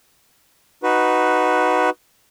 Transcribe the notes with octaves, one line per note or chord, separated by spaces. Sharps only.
D#4 F#4 B4